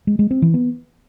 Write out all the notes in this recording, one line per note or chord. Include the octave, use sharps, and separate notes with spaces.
G#3
G#3
C4
E3
B3